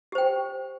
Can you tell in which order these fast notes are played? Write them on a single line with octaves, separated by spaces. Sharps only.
G4 C5 G5